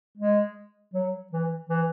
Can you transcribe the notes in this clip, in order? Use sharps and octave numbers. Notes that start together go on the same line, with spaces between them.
G#3
F#3
E3
E3